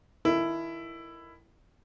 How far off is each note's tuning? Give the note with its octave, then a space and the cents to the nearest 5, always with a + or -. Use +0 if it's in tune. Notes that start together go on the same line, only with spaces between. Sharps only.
D#3 +0 E4 +15 A4 +0